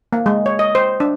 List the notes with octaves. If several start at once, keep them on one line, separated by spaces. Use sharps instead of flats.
A#3
G#3
C#5
D#5
C5
D4